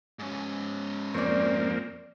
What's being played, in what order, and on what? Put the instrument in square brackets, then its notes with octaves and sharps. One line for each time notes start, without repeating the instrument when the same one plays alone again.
[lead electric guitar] G#2 C#4
[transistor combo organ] F2 A#3 C4 [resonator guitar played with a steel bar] C#5 D5